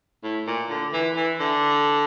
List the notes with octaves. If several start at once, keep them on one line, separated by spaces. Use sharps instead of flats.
A2
A#2
D3
E3
E3
D3